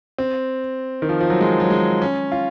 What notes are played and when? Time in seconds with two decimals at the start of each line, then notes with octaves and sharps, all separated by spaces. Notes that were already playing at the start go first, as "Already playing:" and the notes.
0.18 C4
1.02 D#3
1.09 F3
1.21 F3
1.30 F#3
1.40 G#3
1.60 F#3
1.70 G#3
2.02 C#4
2.32 F4